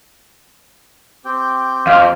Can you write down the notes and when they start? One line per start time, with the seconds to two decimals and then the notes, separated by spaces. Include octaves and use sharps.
1.25 C4 G4 G5
1.87 F2 F5